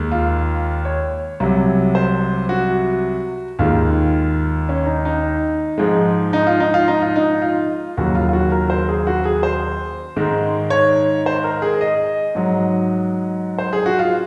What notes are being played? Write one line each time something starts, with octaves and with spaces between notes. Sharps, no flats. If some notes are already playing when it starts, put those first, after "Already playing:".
Already playing: D#2 G#3
F4
C#5
C2 C3 F#3
C5
F#4
D#2 D#3 G#3 F4
C#4
D#4
D#4
G#2 F3 G#3
D#4
F4
D#4
F4
D#4
F4
D#4
F4
D#2 C#3 F#3 F#4
F4
F4
F#4
A#4
C5
G#4
F#4
G#4
C5
G#2 D#3 G#3
C#5
C5
A#4
G#4
D#5
G#2 F#3
C5
G#4
F#4
F4